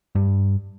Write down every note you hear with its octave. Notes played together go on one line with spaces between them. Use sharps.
G2